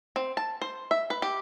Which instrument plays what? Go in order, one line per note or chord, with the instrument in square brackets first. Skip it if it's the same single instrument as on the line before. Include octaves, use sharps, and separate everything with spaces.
[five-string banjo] C4
A5
C5
E5
B4
G4